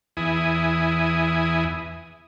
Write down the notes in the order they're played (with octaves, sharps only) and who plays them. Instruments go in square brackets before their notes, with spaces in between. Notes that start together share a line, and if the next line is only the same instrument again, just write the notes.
[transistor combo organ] E2 E4 G#5 D#6